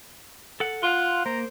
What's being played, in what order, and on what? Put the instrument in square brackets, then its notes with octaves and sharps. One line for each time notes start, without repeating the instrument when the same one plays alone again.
[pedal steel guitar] A4 F#5
[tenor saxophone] F4 [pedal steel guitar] F5 C6 [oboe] F#5
[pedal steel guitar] A#3 [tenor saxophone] C5 [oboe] A#5